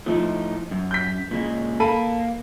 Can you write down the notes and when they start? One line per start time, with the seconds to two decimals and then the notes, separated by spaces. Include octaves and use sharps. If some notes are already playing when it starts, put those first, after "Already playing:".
0.06 A2 F3 A3 D#4
0.71 F#2
0.91 G6 B6
1.31 A#2 C#3 G#3
1.80 A#3 A4 B5 D#7